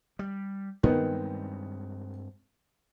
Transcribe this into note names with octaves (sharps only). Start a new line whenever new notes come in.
G3
G2 D#3 G#3 B3 C4